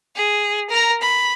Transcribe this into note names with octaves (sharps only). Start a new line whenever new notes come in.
G#4
A#4 A#5
B5